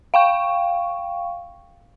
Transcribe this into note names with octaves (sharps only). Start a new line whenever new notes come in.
F5 G5 C#6